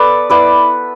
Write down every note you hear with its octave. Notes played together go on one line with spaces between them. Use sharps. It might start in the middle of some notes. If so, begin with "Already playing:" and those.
Already playing: B3 A4 B4 D5
B3 E4 B4 D5